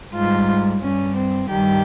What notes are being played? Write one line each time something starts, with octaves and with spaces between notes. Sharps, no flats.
G#2 G3 F4
G2 G3 C#4
C4
G2 D#3 G3 G4